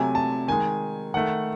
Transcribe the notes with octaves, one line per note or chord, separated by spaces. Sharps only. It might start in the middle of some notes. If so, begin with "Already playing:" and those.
Already playing: C3 F#3 A3 G#5
A5
D#3 G#3 G#5
D#3 A3 F#5